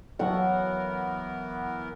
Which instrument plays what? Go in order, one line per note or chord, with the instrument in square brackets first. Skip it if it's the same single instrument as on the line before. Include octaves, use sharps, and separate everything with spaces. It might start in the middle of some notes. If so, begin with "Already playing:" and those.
[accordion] E3 B3 A#4 [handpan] F#3 A4 [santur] F#5 C#6